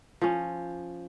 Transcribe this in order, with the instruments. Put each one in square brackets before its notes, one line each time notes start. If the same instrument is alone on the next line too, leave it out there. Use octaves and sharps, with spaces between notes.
[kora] F3 C#4